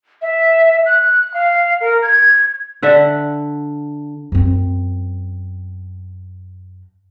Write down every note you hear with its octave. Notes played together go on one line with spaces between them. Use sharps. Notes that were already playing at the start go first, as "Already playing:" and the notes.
E5
F#6
F5
A#4
G#6
D3 E5 F#5
F#2 C4